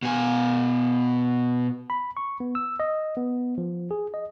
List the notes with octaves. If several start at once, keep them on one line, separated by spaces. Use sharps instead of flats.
B2 G#5
B5
C#6
B3
E6
D#5
B3
F3
G#4
D#5